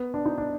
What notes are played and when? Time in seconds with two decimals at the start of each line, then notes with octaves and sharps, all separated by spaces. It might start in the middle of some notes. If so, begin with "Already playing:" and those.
Already playing: B3
0.14 D4
0.25 D#4
0.38 D4